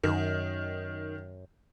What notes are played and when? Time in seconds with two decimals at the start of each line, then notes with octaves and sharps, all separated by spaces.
0.04 F#2 D#3